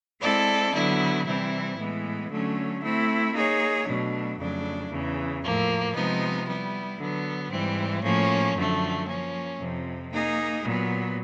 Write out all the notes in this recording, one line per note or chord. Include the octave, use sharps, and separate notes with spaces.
G#3 C4 E4 A4 D5
D3 F#3 B3 E4
C3 E3 G3 C4 E4
A2 E3 G#3 B3
D3 F#3 A3 C#4
A3 C4 E4
A#3 D#4 G#4 C#5
B2 F#3 A3 D4
F2 C#3 F#3 A3 D4
E2 C#3 E3
A2 F3 A#3
C3 F3 G#3 B3 D#4
G3 B3 E4
D3 F#3 B3
G#2 E3 G3 C4
A2 F3 A#3 C#4
F#2 D3 F3 A3
F3 A#3 C#4
F2 C3 F3
A#3 D#4 G#4
A#2 F#3 B3